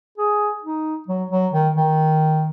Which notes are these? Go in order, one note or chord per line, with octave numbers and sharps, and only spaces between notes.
G#4
D#4
F#3
F#3
D#3
D#3